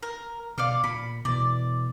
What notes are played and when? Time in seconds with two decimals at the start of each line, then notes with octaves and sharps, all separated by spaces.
0.03 A#4
0.58 B2 D5 F5 F6
0.84 A#2 B5
1.25 B2 E3 D5